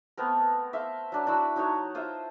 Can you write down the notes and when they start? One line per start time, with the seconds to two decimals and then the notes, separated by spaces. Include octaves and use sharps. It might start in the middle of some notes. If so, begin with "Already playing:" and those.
0.17 A3 B3 C4 A#4
0.73 E5 F5 C6
1.12 F#3 D4 C5
1.27 D4 E4 F#4 E6
1.56 F#3 D#4 F#4 C#5
1.95 F4 C5 D#5 E5